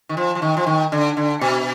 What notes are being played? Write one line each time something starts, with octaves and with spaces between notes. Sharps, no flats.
D#3
F3
F3
D#3
F3
D#3
D3
D3
B2